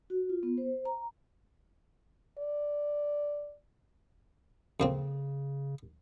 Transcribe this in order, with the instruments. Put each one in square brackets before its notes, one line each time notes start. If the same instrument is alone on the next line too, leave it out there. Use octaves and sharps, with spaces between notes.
[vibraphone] F#4
F4
B3
C5
A#5
[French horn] D5
[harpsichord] F2 A#3 C4 [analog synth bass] C#3